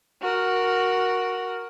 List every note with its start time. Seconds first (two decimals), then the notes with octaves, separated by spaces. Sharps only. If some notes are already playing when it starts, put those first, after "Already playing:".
0.22 F#4 A#4